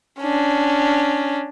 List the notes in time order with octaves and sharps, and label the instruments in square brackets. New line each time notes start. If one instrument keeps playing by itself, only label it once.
[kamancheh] C#4 D4